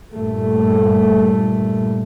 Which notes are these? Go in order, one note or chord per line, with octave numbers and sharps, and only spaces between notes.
G2 A#2 A3